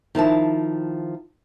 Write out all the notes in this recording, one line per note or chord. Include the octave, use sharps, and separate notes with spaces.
D#3 F3 E4 A5